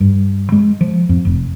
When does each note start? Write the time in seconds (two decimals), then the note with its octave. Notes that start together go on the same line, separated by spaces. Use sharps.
0.01 G2
0.52 G#3
0.81 F3
1.09 F2
1.25 F1